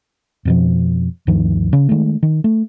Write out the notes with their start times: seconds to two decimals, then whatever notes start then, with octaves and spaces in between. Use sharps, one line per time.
0.45 F2 B2 F3
1.27 D2 G2 D#3 F3
1.73 C#3
1.89 D#3 G#3 A3
2.23 D#3
2.44 A3